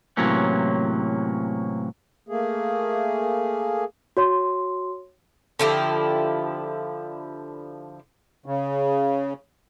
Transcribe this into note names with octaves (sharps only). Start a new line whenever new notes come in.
A2 C3 E3 F#3 A#3 C#4
A3 A#3 G#4
F#4 C#5 C6
D3 F3 E4 G4
C#3